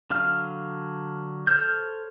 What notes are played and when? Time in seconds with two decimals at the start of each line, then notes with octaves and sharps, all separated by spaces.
0.10 D3 F#3 F5 F6
1.47 A4 C5 C#5 F6 G6